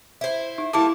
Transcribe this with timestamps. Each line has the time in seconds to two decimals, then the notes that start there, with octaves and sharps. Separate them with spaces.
0.21 E4 C5
0.58 D#4
0.73 G3 A3 A#3 E4 A5 D6